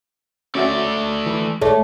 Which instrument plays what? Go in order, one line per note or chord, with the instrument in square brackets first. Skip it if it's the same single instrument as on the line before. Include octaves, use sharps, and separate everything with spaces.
[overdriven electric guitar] A3 D5 [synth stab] C#4 F#4 E5
[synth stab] E3
[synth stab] A1 C#5 D5 [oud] A3